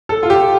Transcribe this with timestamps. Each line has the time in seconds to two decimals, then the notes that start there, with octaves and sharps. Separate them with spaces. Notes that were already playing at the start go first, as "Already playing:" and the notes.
0.09 A4
0.23 F4
0.30 G4